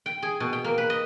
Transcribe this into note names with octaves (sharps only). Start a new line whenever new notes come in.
G5
G#4
B2
G5
A#3
B4
D#5